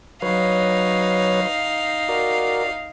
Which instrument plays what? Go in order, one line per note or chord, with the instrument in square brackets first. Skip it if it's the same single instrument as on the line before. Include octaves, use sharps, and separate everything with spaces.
[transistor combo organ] F#3 B4 C#5 [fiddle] D#4 F5
[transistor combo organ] F#4 A#4 D5